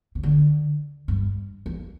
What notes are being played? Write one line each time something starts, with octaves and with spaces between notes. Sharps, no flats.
C3
D3
G2
F2